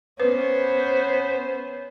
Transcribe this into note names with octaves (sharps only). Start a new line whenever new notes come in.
B3 C#4 B4 C5